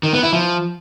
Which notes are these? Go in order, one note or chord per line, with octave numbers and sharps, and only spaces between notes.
D#3
B3
E4
F3